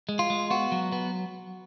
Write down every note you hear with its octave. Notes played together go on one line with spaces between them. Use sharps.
G#3
F4
G#3
B3 F#4
F#3
B3